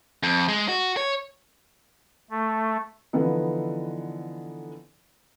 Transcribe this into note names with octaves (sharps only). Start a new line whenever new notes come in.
F2
G#3
F#4
C#5
A3
D3 E3 F3 B3 D#4